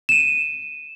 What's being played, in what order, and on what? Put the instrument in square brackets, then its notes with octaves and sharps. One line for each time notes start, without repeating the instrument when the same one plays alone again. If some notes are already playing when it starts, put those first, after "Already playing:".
[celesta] D#7 E7